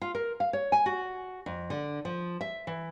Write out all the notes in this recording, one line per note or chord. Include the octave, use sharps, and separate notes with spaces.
F4
A#4
F5
C#5
G#5
F#4
F2
D3
F3
E5
E3